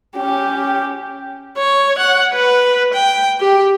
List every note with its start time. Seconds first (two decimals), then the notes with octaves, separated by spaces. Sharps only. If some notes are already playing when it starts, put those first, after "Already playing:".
0.16 C#4 G4
1.58 C#5
1.99 F#5
2.33 B4
2.94 G5
3.40 G4